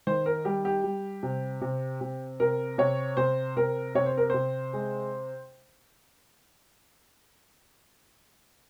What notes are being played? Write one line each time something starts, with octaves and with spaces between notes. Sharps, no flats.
D#3 C5
A#4
G3 G4
G4
G3
C3
C3
C3
C3 A#4
C3 C#5
C3 C5
C3 A#4
C3 C#5
C5
A#4
C3 C5
G#3